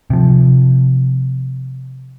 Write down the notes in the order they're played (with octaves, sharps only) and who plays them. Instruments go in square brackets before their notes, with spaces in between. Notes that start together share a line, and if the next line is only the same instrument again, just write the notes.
[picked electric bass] C3 F3